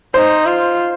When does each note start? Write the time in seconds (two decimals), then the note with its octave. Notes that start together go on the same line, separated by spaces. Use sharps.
0.14 D#4 C5
0.46 F4